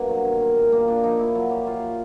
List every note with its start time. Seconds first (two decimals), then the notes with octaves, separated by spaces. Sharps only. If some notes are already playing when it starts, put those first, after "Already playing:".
Already playing: G2 B2 A#3
0.09 F#3
0.25 D#3
0.41 D#3
0.56 A#2
0.72 A#2 A#3
0.88 A#2 D4
1.03 F3 D#4
1.19 A#2 E4
1.35 F#3 F4
1.51 F#3 G4
1.67 A#2 F4